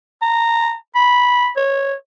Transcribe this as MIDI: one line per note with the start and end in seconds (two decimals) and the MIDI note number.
0.22 0.75 82
0.95 1.49 83
1.57 1.94 73